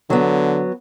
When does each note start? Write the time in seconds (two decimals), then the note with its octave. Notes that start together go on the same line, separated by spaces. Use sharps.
0.10 D3 F#3 B3